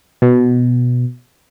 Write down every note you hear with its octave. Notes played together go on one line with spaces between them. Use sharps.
B2